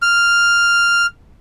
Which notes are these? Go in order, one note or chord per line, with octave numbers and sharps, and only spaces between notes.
F6